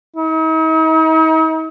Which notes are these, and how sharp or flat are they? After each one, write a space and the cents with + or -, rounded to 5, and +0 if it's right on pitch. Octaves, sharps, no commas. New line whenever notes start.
D#4 +45